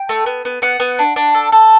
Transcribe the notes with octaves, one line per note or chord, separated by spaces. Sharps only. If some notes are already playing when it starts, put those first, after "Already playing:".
Already playing: G5
A3
B3
B3
B3 F#5
B3
D4
D4
A4
A4